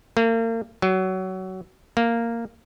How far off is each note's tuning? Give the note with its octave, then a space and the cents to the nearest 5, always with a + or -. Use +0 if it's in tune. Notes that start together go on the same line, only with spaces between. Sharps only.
A#3 -40
F#3 +20
A#3 -10